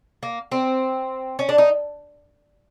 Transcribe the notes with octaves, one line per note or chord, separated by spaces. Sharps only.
A#3
C4
C#4
D4
D#4